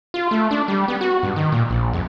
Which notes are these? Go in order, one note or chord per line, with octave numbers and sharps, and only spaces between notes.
F4
A3
D4
G3
B3
F#4
G2
D#3
A#2
A#1
F2